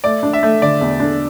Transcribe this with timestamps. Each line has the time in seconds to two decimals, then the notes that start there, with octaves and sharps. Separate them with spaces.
0.04 A3 D5
0.23 D4
0.33 E5
0.43 A3
0.62 D3 D5
0.81 E2
1.00 D4